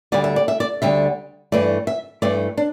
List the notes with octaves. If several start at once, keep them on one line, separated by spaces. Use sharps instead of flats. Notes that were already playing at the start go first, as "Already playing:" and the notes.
D2 D3 G3 D5
E5
D5
E5
D5
D2 D3 G3 E5
G2 E3 A3 D5
E5
G2 E3 A3 D5
D4